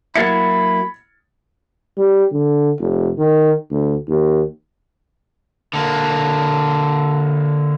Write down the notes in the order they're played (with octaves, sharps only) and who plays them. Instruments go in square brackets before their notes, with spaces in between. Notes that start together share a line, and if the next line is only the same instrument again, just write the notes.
[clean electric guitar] F#3 A#3 E4 [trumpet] B5 [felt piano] G#6 A6 C#7
[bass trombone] G3
D3
F1
D#3
D2
D#2
[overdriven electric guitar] D3 A#3